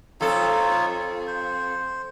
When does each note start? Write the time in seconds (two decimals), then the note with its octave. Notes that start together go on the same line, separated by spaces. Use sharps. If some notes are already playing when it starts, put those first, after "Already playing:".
0.21 F2 D#4 F4 A4 C#5
1.27 C5